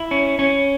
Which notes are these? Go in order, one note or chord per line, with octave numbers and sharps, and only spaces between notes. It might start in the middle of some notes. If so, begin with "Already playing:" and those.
Already playing: E4
C#4
C#4